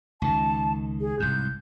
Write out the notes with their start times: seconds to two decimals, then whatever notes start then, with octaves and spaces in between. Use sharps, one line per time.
0.22 C#2 D#3 A5
1.01 G#4
1.20 C2 G#2 G6